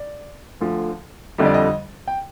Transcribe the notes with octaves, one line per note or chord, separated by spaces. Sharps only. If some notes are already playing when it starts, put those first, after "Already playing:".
Already playing: D5
D2 D3 F3
F2 D3 G3 D#5
D5
D#5
G5